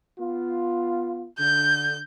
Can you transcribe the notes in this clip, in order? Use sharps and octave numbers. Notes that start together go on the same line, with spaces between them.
B3 F4
D3 G6